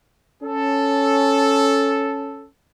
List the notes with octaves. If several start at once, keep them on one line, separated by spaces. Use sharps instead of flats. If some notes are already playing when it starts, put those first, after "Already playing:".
C#4 A4